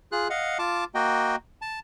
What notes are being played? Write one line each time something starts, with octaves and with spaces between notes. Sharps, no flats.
F4 G#4 F#6
D#5 F5 F#5
F4 A5 D6
A#3 F#4 D#5 G5
A5